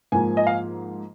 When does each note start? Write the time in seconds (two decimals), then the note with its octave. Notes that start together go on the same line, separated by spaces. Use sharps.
0.12 G#2 F3 A#3 G#5
0.37 D#5
0.47 F5